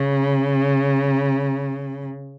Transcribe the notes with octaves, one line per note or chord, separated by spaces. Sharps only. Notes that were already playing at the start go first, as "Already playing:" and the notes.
Already playing: C#3